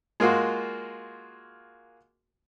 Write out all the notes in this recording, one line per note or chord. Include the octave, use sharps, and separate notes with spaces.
G#3 A#3 F4 F#4